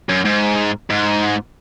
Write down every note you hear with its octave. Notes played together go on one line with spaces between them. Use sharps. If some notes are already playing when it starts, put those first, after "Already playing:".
F#2
G#2
G#2